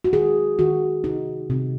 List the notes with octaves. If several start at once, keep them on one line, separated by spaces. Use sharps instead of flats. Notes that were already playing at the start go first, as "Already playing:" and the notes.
F#4
D#3 G#4
D#3 F#4
C3 D#4
C3